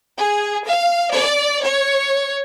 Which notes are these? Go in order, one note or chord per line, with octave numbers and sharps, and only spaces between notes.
G#4
F5
D5
C#5